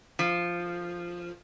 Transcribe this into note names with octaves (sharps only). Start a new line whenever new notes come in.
F3